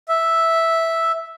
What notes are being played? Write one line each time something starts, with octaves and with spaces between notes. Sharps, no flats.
E5